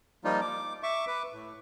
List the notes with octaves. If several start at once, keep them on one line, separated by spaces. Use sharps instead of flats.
F3 G3 A#3 D#4 F4
D6
E5 C#6 D6
B4 D6
A2